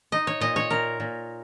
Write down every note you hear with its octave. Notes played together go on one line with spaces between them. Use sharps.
D#4 D#5
C#5
A#2 D#5
C#5
A#2 A#4
A#2